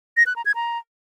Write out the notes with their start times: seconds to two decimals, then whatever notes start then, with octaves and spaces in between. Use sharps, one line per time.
0.17 A#6
0.26 F#6
0.36 A#5
0.46 G#6
0.55 A#5